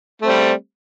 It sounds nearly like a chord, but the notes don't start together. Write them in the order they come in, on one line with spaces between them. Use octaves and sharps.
A3 C4 G3